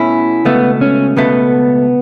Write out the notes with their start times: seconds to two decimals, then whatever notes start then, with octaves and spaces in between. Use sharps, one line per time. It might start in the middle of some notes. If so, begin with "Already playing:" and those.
Already playing: B2 A3 C#4 E4
0.45 C#2 B2 A3 B3
0.81 C#4
1.17 C#2 B2 A3 B3